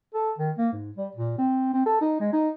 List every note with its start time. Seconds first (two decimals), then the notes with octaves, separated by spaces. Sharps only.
0.14 A4
0.39 D#3
0.58 A#3
0.72 G#2
0.97 G3
1.15 A#2
1.38 C4
1.73 C4
1.86 A4
2.01 D#4
2.20 G#3
2.33 D#4